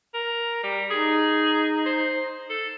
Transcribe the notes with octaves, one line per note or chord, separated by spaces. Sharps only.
A#4
G3
D#4 G#4
C5
A4